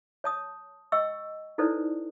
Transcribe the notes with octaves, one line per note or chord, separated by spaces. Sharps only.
C#5 A5 D#6
D#5 G5 C#6 E6
D#4 E4 A4 B4 C5 D5